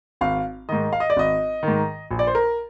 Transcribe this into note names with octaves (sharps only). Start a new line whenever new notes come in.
G#1 F5
G#2 D#3 D#5
F5
D#5
D5
G#1 D#5
D#3
G#2
A#1
D5
C5
A#4